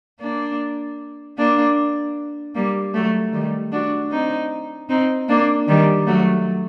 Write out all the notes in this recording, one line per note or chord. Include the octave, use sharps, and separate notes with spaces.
A#3 D4
A#3 D4
G3 A#3
F#3 A3
D#3 G3
D4 F#4
C4 D#4
C4 D#4
A#3 D4
D#3 G3
F#3 A3